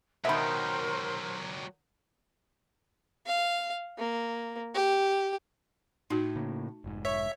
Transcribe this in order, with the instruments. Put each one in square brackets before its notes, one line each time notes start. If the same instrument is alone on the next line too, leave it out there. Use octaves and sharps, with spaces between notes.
[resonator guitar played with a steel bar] B2 D#3 [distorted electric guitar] F#3 G4 [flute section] A#4 C5 [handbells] E5 B5
[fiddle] F5
A#3
G4
[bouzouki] A2 [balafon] D#4 F#4
[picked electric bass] C#3 A#3
F1 G#2
[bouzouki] C#5 [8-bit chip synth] E5